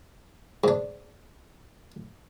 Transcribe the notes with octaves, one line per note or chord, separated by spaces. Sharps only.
G#2 D4